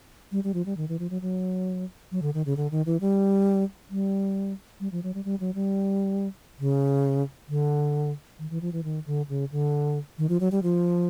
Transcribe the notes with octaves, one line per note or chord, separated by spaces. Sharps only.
G3
G3
F3
G3
D#3
E3
F3
F#3
F#3
F#3
D3
D#3
C#3
D3
D#3
E3
G3
G3
G3
F3
F#3
G3
G3
F#3
G3
C#3
D3
D#3
E3
F3
E3
D#3
D3
C#3
D3
D#3
F3
F#3
G3
F3